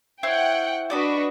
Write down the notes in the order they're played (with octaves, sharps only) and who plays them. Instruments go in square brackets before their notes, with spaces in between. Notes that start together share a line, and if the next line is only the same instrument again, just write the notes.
[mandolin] E4 C5 C#5 [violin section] F#5 G5
[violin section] D4 F#4 B4 [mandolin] D5 D#5 B5